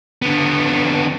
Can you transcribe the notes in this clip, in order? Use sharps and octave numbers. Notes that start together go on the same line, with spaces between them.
D3 B3